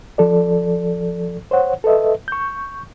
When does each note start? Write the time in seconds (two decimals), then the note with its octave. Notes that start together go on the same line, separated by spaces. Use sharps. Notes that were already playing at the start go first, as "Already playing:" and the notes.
0.18 F3 A4 D5
1.51 C5 C#5 F#5
1.84 A4 B4 D#5 E5
2.28 C#6 G6